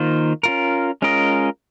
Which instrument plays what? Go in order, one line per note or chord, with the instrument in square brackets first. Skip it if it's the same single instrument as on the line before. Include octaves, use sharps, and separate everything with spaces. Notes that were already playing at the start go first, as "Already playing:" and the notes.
Already playing: [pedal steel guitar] D#3 A#3 F4 C5
C#4 F4 A#4
G#3 C#4 F4 A#4 D#5